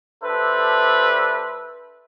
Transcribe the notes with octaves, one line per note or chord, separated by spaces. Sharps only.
G3 D4 A4 B4 C5 E5